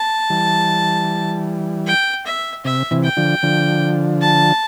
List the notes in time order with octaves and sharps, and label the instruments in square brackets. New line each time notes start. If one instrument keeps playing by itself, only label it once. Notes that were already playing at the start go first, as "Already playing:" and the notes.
Already playing: [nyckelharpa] A5
[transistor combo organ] E3 G3
[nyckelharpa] G5
E5
[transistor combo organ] C3 [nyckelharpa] E5
[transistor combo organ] C3 E3
[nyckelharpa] G5
[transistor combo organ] D3 F3
D3 F3
[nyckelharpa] A5